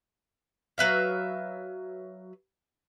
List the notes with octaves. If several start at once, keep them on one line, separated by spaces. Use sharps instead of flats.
F#3 B4 E5 F5